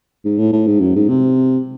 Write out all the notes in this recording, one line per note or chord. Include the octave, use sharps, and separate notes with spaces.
G#2
A2
A2
G#2
F#2
G#2
C3